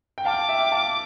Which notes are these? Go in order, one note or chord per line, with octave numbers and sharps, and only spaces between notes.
G5
F5 A5 D6
E5 G5
F5 A5